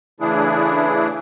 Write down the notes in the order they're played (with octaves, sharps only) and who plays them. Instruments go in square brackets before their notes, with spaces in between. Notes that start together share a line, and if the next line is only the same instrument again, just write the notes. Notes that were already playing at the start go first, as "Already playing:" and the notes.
[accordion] C#3 E3 A3 D4 E4 G#4